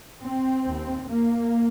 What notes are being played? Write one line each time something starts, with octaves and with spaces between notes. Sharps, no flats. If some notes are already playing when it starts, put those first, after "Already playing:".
C4
D#2
A#3